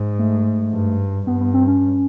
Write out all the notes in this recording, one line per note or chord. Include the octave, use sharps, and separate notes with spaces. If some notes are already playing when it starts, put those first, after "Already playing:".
Already playing: G#2
A3
G2
G2 B3
B3
C4
C#4